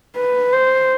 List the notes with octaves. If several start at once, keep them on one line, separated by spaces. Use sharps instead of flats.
B4
C5